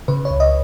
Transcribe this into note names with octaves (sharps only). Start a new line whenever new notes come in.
C#3 B4
C#5
C#2
D#5